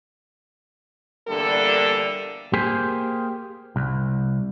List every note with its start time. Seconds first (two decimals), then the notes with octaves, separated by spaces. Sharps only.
1.28 E2 D3 G3 A#3 D4 A4
2.53 A#3 G4 G#4 C5
3.76 C2